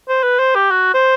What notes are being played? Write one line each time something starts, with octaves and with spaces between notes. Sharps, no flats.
C5
B4
C5
G4
F#4
C5